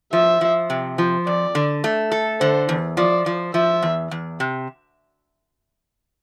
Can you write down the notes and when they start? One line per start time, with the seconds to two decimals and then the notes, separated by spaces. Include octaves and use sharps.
0.13 F3 E5
0.41 F3
0.70 C3
0.98 F3
1.26 F2 D5
1.55 D3
1.84 A3
2.12 A4
2.40 D3 C5
2.69 E2
2.97 F3 D5
3.26 F3
3.54 F3 E5
3.83 E2
4.11 E2
4.40 C3